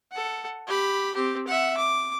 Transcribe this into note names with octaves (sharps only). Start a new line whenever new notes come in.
A4 F#5
G4 B5
C4 G4
E5 F#5
D6